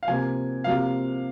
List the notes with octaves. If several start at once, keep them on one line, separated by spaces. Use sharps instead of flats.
F5
C3 F3 A#3 G#5
C3 F3 A#3 F5